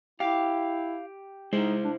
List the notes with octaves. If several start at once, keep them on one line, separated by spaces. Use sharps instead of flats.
E4 G4 F5
G#3 D#4 E4 C5
D4